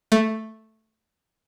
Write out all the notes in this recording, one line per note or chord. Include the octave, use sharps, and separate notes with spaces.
A3